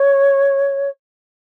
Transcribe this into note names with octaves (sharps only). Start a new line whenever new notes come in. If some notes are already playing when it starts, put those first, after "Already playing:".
Already playing: C#5